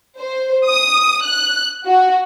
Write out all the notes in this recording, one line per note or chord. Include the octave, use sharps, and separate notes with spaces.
C5
D#6
F#6
F#4